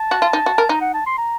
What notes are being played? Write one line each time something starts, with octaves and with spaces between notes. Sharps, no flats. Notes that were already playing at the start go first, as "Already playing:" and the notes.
Already playing: A5
F#4
F4
D#4
F#4
A#4
D#4 A#5
F#5
A5
C6
A#5